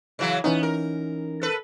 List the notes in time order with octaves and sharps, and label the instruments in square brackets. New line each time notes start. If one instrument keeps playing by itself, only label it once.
[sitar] C#3 E3 F#3
[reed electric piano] E3 C#4 D#4 [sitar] B3
[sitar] A#4
A4 B4